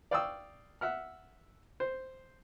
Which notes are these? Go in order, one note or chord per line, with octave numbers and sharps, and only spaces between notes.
D5 F5 G5 C#6 D#6 E6
E5 F#5 F6
C5